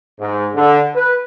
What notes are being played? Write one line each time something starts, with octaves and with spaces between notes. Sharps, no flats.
G#2
D3
B4